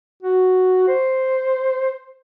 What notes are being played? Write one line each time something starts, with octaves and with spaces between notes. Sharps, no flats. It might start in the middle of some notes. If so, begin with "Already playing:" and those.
F#4
C5